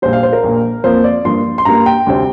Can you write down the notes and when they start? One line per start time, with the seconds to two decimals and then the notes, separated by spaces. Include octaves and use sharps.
0.02 A#1 A#2 G3 C5
0.13 F5
0.23 C5
0.33 A#4
0.43 A#1 A#2 A#3
0.84 F2 F3 A#3 C5
1.04 D5
1.25 G2 F3 A#3 C6
1.58 C6
1.65 G2 G3 A#3 A#5
1.86 G5
2.07 D2 C3 G3 C4